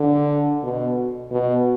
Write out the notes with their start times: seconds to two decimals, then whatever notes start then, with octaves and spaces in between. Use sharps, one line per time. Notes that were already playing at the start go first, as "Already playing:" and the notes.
Already playing: D3
0.63 B2
1.31 B2